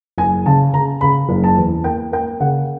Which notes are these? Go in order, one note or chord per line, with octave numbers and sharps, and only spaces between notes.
F#1 G#5
C#3 A5
C#3 A#5
C#3 B5
F#1
A5
E2
A#3 G5
A#3 G5
C#3 F#5